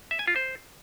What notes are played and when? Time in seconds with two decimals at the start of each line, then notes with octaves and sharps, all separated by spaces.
0.11 E5
0.19 G#5
0.27 F4
0.36 C5